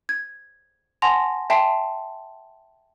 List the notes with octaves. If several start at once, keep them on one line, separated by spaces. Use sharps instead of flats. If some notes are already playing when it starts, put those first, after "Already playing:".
G#6
F#5 G#5 A5 C6 A#6 F7
E5 G5 A5 C6 C7